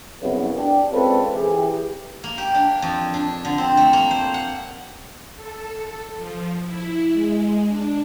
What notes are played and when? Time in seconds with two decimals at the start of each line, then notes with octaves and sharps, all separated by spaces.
0.21 C2 F#2 C#3 B3
0.57 D4 G4
0.93 G#3 C4 C#4 F4 A4 B4
1.34 E3 G4 G#4
2.24 A#3
2.38 G4
2.55 D4
2.82 F2
3.14 D4
3.45 D3
3.58 C4
3.77 A3
3.93 A#3
4.11 C5
4.34 F#5
5.37 A4
6.17 F3
6.64 E4
7.13 G#3
7.66 D4